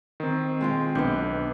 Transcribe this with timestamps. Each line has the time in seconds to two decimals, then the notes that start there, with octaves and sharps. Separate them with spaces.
0.20 D#3 C4
0.61 G#3 F4 G5
0.95 B1 B3 D4 G6